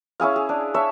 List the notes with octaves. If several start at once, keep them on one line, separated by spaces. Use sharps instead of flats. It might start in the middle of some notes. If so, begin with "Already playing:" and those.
C#4 E4 G#4 F5
G#4
D4
C#5 E5 A5